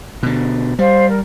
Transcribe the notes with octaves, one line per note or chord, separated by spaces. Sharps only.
B2 D3
G3 C5 F5
A#4